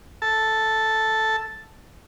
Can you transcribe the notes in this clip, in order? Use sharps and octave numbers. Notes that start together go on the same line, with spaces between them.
A4 A5